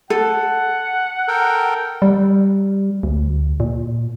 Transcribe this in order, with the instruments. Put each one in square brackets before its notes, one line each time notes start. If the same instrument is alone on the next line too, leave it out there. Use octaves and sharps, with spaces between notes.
[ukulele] A4 [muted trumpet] F#5
[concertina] A4 A#4 G5
[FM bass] G3
D2
A#2